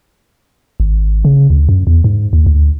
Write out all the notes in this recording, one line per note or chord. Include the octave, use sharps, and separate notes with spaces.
G#1
C#3
D2
F#2
E2
G#2
D#2
D2